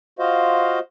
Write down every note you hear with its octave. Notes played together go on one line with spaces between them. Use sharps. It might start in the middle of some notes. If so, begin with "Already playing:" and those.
F4 F#4 C5 D#5 F5